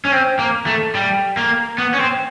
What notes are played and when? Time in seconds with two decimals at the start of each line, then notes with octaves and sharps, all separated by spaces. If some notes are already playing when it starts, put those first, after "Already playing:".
0.05 C#4
0.12 C4
0.39 A#3
0.66 A3
0.95 G3
1.37 A#3
1.78 B3
1.94 C#4
2.00 C4